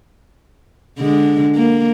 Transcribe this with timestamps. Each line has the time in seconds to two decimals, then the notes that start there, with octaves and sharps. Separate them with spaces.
0.99 D3 G#3
1.56 A#3